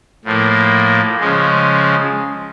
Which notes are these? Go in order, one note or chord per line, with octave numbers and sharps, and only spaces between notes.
A2 F3 A#3
C#3 F3 G#3